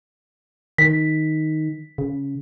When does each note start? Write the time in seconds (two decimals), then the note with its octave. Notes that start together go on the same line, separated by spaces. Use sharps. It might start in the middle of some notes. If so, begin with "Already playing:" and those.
0.78 D#3 B6
1.98 C#3